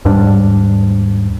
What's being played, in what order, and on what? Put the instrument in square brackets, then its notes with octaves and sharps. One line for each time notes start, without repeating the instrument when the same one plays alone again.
[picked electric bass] D#2 G#2 G3 D4